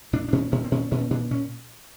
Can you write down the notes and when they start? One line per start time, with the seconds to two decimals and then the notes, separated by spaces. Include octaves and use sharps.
0.13 A#2 D4
0.28 D4
0.33 A#2 C#4
0.52 A#2 C#4
0.64 C4
0.72 A#2 C#4
0.91 A#2 C#4
1.11 A#2 D4
1.31 A#2 C#4